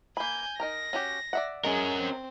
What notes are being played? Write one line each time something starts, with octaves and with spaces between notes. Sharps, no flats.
A#3 G#5 B5 G6
D#4 A#4 A#5 A#6
C#4 F#4 G4
D5 E5 F#5
G#3 C#4 G#4 A#4
C4